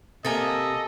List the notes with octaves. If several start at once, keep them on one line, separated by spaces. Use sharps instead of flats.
C3 A#3 A4 D#5 E5 G#5 A6